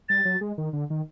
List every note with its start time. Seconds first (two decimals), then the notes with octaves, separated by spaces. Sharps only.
0.09 G3 A6
0.25 F#3
0.41 G#3
0.58 D#3
0.73 D3
0.90 D#3